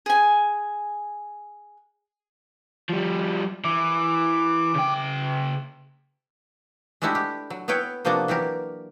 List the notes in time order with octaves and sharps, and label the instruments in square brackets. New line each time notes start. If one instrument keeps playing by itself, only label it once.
[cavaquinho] G#4 G#5
[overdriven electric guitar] F3 G3
[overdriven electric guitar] E3 [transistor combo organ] D6
[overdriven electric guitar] C#3 G5
[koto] G#3 A3 D4 E4 F#4 G4
G4
F#3
B3 E4 B4 C#5 G5
C3 F3 A#3 B3 D4 F#4
E3 F#3 G4 A#4